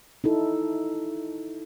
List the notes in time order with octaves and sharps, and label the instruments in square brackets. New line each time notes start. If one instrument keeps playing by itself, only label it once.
[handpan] D#4 E4 A4